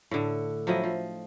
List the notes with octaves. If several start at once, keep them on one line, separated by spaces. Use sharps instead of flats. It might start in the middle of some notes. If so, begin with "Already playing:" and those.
A2 D3
F3 F#3 E4 D#5
F3